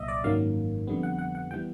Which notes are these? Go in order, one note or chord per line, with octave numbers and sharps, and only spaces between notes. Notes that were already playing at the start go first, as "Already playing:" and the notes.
Already playing: C2 A#2 F#3 D#5 E5
D5
G#1 F#2 D#3 F#3 A#3 F5
F2 D3 G3 B3
F#5
F#5
F#5
E3 G3 B3 G5